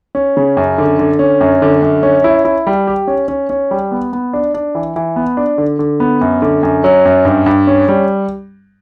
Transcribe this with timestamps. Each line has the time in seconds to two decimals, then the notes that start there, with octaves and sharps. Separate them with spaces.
0.15 C#4
0.37 C#3
0.57 F#2
0.78 D3
0.99 D3
1.19 C#4
1.41 F#2
1.62 D3
1.82 F#2
2.03 C#4
2.24 E4
2.45 E4
2.67 G3
2.87 G4
3.07 C#4
3.28 C#4
3.50 C#4
3.71 G3
3.92 B3
4.13 B3
4.33 D4
4.54 D4
4.75 E3
4.96 E3
5.16 B3
5.37 D4
5.58 D3
5.79 D3
6.00 B3
6.21 F#2
6.42 D3
6.63 F#2
6.84 F#3
7.05 F#2
7.25 G2
7.46 G2
7.67 C#4
7.88 G3